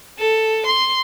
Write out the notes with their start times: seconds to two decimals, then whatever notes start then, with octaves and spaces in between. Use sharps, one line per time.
0.19 A4
0.66 C6